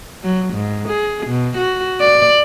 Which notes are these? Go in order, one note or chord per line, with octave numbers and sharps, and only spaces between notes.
F#3
G#2
G#4
B2
F#4
D5